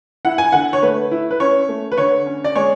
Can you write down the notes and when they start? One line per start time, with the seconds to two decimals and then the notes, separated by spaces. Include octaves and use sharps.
0.25 E4 F#5
0.38 G#5
0.52 D3 F#5
0.73 C#5
0.82 A3 B4
1.11 E4
1.31 B4
1.40 C#4 C#5
1.69 A3
1.92 B4
1.97 D3 C#5
2.26 C#4
2.44 D5
2.56 G#3 C#5